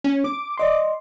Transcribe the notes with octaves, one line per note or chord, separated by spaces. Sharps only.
C#4
D6
D5 D#5 C6